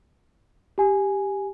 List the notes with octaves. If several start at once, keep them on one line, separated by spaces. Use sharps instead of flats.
G4 G#5